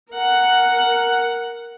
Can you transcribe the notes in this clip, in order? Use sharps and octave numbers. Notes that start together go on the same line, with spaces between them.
A#4 F#5